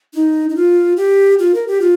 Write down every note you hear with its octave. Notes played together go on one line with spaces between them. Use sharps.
D#4
D#4
F4
G4
F4
A#4
G4
F4